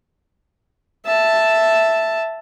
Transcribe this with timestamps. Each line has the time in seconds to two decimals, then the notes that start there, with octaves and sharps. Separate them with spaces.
1.06 E5 A5